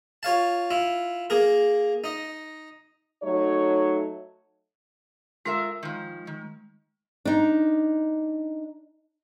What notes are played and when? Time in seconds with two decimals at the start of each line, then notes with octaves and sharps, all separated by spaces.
0.23 F4 C#5 F5 A5
0.71 E4 F4
1.30 A#3 G#4 A#4
2.04 D#4 D#5
3.22 F#3 A3 D#4 C#5
5.45 G#3 F4 A#4 E5
5.83 D#3 F3
6.27 D#3
7.25 D4 D#4